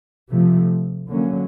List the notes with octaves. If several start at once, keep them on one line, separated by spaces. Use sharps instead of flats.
C3 F3 A3
D3 F#3 A#3 C#4